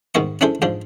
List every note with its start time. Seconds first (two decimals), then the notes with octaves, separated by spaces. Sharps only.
0.15 G#2 D#3 B3 D#5 C#6
0.41 C#4 D4 E4 G#4 A4 C5
0.62 G#2 F3 D4 C5